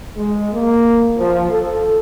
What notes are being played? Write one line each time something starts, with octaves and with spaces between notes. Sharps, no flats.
G#3
A#3
F3
A4